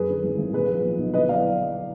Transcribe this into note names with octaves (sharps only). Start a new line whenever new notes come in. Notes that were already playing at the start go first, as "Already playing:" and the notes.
Already playing: F#2 G#4 B4
D3
G#1
G#1
A#2 G#4 B4
F3
B1
B1
D3 B4 D#5
F#3 D5 F5